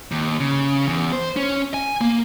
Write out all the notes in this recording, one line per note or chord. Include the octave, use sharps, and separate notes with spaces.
D#2
C#3
E2
C5
C#4
G#5
A#3